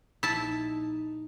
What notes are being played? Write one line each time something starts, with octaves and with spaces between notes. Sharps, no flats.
A#1 D#4 E4 A5